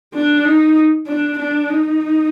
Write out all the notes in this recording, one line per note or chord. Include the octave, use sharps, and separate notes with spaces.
D4
D#4
D4
D4
D#4